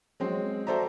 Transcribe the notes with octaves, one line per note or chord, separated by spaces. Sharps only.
F#3 G#3 C4
F#4 A4 C5 D5 E5 A#5